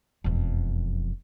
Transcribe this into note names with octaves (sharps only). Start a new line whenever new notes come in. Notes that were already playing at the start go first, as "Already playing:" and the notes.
E1 F2